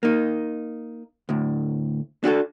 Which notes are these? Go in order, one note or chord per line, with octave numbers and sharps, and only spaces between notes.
A#3 D#4
D2 A2
D4 F#4 G4 A4